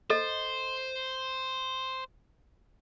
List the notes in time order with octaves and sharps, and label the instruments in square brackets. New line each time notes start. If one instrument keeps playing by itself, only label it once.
[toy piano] A4 D#5 [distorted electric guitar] C5